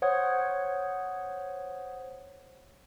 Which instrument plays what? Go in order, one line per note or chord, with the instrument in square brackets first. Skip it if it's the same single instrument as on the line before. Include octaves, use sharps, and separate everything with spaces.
[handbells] C5 C#5 F#5 D#6 G#6